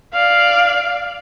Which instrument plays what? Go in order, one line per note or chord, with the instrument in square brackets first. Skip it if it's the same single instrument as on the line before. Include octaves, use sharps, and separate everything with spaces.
[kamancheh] D5 F5